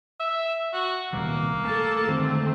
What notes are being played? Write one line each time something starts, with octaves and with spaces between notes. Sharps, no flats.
E5
F#4
D#1 C2 B2 A#3
A3 A4 A5
D3 D#3 G#3 A3 C4